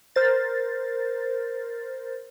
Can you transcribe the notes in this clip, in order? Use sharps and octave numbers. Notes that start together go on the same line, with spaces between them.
A#4 C5 A6